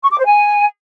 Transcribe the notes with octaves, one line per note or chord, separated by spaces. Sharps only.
C#6
D6
C5
G#5